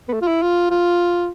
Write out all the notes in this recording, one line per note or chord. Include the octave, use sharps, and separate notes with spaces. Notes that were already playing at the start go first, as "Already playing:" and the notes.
B3
A3
F4
E4
F4
F4